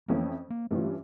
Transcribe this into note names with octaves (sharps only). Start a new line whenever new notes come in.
F2 E3 A3 A#3 C#4
A#3
G2 E3 G3 A3 C#4 F4